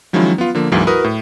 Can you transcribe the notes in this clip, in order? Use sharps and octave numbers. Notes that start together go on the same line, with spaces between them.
D#3 F3 F#3 G#3 C#4 E4
B3 F4
D3 F3 A#3
D2 G#2 E3 F#3 A#3
E4 F#4 A#4 B4 D#6
A2